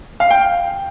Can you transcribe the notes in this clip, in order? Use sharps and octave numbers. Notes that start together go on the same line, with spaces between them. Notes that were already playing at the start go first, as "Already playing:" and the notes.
F5
G5